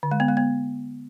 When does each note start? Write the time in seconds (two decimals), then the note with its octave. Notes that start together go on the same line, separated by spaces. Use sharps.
0.03 D3
0.11 G#3
0.20 B3
0.28 G#3
0.37 B3